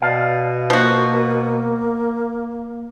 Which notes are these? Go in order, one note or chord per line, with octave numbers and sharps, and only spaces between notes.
B2 D5 F5 A5
F3 A#3 F#4